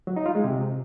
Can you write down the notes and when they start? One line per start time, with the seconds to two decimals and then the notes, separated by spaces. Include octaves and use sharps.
0.07 F#3
0.16 D#4
0.26 F4
0.35 G#3
0.44 C3